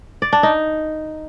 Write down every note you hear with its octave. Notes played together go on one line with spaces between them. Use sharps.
D5
D4
D#4